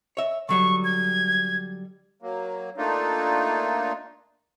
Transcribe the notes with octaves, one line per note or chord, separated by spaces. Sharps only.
C#5 E5
D3 F#3 G3 C#6
G#6
F#3 A#3
A3 A#3 D4 D#4 F4